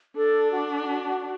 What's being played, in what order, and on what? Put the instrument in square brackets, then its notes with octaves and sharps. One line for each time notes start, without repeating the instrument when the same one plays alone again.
[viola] D4 [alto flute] A4
[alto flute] F#4